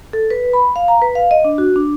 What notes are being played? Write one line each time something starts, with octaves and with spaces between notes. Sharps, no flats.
A4
B4
B5
F5
A#5
B4
F5
D#5
D4
F#4
D4